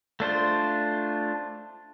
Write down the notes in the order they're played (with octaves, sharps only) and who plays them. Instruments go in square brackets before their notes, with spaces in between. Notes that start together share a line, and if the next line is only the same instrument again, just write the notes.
[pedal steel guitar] A3 D4 F4 C5